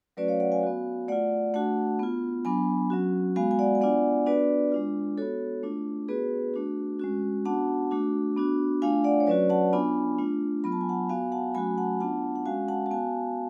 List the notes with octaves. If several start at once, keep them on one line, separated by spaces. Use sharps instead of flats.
F#3 A3 C#4 F#4 B4 D5
C#5 F5
D5 F#5
F5 G#5
B3 F#4
A3 F4 D5 F#5
A3 D4 F#4 F#5 A5
B3 F4
F#3 B3 D4 G#5 B5
F#3 C#4 F#4
G#3 B3 F#4 F5 G#5
G#5
D5 F#5
G#5
B3 D4 F4 D5 F#5
B3 D4 F#4 B4 D5
G#3 D4 F4
B3 F#4 A4 C#5
A3 D4 F4
B3 F#4 G#4 B4
A3 D4 F#4
G#3 C#4 F#4
B3 D4 F#4 F#5 A5
A3 D4 F#4
B3 D4 F#4
A3 D4 F4 F5 G#5
D5 F#5
C#5
F#3 C#4 F#4 B4 D5
F#5 A5
B3 D4 F4 G#5 B5
A3 D4 F4
F#3 B3 F4 B5
A5
G#5
F#5 A5
B3 F#4 F5 G#5
F#5 A5
F#3 A3 C#4 F#4 G#5 B5
F#5 A5
B3 D4 F4 F#5 A5
F#5
G#3 C#4 F#4 F5 G#5
F#5 A5
A5
B3 F#4 F5 G#5